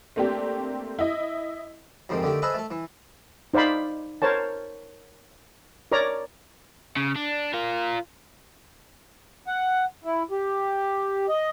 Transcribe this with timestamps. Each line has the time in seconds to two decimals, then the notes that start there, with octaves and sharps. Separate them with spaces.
0.16 A3 A#3 C4 D4 G4
0.99 E4 D#5
2.09 F2 G#2 C3 D#3
2.23 D3 D#3 A3 G4
2.42 G#4 A4 B4 C5 D#5 E5
2.54 A3 A4
2.71 E3
3.54 D#4 C5 D5 F5 B5
4.22 A#4 C5 C#5 A5
5.92 A#4 C#5 D5 A#5
6.97 C#3
7.16 D4
7.54 F4 A#4
9.47 F#5
10.04 E4
10.31 G4
11.29 D#5